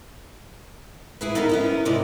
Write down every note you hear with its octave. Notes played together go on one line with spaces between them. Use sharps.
E4 G#4 B4
B3 D#4 E4 A4 A#4
B3 C#4 E4
G#2 C3 C4 D#4 D5